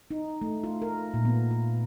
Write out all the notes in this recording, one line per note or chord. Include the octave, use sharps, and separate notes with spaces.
D#4
A3
F4
A#4
A#2
B3
F4